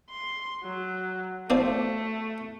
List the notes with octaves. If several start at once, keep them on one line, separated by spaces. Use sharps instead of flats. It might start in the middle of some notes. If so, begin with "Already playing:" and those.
C6
F#3
F3 A3 C4 D5